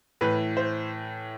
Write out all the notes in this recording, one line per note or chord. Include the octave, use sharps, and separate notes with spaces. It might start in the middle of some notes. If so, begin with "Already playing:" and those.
A2 E3 B4
C5